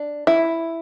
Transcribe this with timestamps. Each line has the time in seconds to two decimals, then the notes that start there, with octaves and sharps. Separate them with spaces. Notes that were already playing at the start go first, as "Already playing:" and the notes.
Already playing: D4
0.27 E4